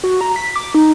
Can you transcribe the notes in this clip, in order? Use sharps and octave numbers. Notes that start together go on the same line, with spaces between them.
F#4
A#5
B6
D6
D#4